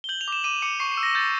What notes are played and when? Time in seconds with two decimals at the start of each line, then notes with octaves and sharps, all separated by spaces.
0.04 G7
0.09 G6 F#7
0.21 F7
0.28 D6 E7
0.44 D6 D#7
0.62 D6 C#7
0.80 C#6 C7
0.92 C7
0.97 E6
1.03 A#6
1.15 G6 A6